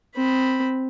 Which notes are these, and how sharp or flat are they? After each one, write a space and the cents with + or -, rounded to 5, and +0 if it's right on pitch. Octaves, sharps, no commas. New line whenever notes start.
C4 +0 B5 +0